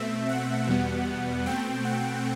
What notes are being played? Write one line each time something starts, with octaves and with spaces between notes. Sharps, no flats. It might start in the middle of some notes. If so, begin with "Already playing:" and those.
Already playing: B2 A3 C4 E5
F#5
E2 B2 G3 B3
B2 A3 C4 G5
F#5